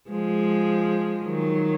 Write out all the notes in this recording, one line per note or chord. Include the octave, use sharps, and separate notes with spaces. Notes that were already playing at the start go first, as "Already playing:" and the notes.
F3 G#3
D#3 F#3